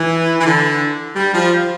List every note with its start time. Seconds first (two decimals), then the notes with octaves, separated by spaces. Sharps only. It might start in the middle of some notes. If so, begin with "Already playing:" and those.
Already playing: E3
0.39 E3
0.45 D3
1.16 G3
1.33 F3